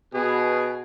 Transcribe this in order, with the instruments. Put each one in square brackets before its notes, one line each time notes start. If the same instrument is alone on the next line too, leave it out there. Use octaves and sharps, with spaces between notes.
[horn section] B2 [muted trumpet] G#4